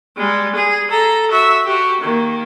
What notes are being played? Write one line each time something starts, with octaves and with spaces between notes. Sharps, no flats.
G3 G#3
G#4
A4 A#5
F#4 E5
F#4 G4
D#3 A#3